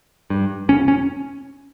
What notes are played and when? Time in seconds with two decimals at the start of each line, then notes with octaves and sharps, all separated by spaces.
0.30 G2
0.69 F1 C#4
0.88 C#4